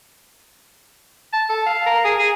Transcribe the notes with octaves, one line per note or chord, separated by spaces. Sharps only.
A5
A4
F5
A#4
G#4
G#4